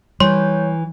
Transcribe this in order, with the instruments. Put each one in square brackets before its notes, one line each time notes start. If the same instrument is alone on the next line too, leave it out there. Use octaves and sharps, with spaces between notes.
[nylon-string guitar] E3 [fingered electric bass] G3 [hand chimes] C#5 [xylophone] C6